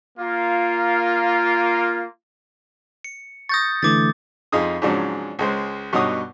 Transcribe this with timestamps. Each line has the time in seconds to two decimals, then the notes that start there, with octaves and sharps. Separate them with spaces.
0.19 A#3 F4
3.04 C#7
3.49 C#6 D#6 G6 A6 A#6
3.83 D3 E3 A3 D6 G#6 A6
4.52 F2 D#4 F4 G#4 D#6
4.82 G#2 C#3 F3 F#3 D4 F#4
5.39 C#2 G#3 C5
5.93 G2 B2 D#4 C#5 F#5 D#6